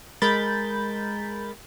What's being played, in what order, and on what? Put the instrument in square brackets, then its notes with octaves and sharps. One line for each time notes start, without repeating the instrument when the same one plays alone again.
[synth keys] G#3 A#4 B5 G6 A6